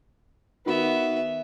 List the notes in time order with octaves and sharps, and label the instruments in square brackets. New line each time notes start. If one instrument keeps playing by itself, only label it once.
[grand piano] D#3 F#4 B5 [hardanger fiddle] B3 E5